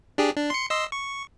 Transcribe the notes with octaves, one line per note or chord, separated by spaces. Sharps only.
D4 G4 G#4
D4
C6 C#7
D#5 C6 E6
C#6